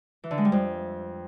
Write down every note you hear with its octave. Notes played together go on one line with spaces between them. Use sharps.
E3
D3
G#3
G3
F2